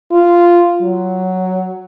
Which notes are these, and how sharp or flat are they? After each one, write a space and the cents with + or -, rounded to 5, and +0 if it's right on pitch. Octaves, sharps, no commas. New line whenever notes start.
F4 -5
F#3 +5